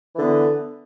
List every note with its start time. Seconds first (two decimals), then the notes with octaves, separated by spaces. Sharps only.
0.15 E3
0.18 D3
0.21 B3